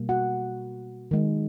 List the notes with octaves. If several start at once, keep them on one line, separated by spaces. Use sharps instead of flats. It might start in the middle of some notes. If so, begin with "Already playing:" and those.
Already playing: B2 G3 A#3
F#4 F#5
D#3 G#3